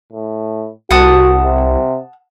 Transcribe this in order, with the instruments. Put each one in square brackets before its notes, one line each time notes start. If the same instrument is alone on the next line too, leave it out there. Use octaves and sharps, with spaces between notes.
[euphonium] A2
[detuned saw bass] C2 [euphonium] F#4 [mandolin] F#5 A5 D#6
[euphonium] C3